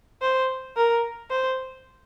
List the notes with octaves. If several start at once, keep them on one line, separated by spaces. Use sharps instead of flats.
C5
A#4
C5